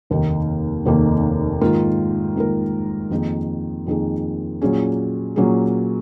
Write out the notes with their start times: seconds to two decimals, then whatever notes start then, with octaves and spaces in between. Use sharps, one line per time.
0.10 F1 D#2 D#3 A#3
0.85 F1 D#2 D#3 A#3
1.61 G#2 D#3 A#3 F4 A#4
2.36 G#2 D#3 A#3 F4 A#4
3.11 F2 D#3 A#3 D#4 G#4
3.87 F2 D#3 A#3 D#4 G#4
4.62 A#2 F#3 A#3 C#4 G#4
5.36 A#2 F#3 A#3 C#4 G#4